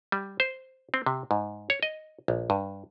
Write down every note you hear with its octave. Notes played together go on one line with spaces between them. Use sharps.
G3
C5
C4
C3
G#2
C#5
D#5
A#1
G2